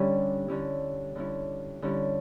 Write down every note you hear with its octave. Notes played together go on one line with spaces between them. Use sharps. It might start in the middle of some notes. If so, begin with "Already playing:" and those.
Already playing: D3 G3 C#4 E4
D3 G3 C#4 E4
D3 G3 C#4 E4
D3 G3 C#4 E4